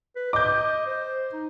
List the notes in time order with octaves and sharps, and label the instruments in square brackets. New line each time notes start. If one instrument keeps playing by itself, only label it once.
[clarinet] B4
[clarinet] D#5 [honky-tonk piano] D6 G6
[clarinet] C5
D#4